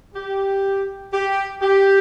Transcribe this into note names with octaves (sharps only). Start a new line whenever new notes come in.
G4
G4
G4